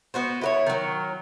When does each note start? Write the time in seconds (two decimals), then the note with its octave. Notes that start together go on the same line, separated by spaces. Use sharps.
0.14 B3 F#4 C5
0.41 E4 B4 C#5
0.67 D#3 F#3